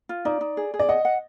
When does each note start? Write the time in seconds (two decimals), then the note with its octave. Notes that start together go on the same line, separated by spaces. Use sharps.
0.09 F4
0.25 D#4 D5
0.41 D#4
0.57 G#4
0.74 G#4
0.79 D5
0.89 D#5 F#5
1.05 F#5